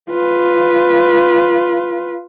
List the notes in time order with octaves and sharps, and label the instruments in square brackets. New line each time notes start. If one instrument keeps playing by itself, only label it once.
[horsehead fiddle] F4 B4